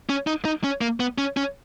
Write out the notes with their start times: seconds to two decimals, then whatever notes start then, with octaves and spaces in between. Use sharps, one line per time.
0.09 C#4
0.27 D#4
0.45 D#4
0.64 C#4
0.81 A#3
1.00 B3
1.18 C#4
1.37 C#4